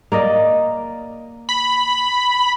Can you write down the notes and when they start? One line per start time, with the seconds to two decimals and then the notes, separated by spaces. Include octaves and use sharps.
0.12 A#3 D5 D#5
1.49 B5